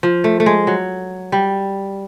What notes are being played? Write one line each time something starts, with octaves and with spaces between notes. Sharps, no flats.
F3
A3
A3
G#3
F#3
G3